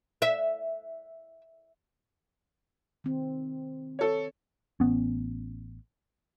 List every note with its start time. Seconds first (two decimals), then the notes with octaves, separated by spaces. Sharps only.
0.22 E5
3.04 D#3 C4
3.99 A4 C#5
4.80 A1 B3 C#4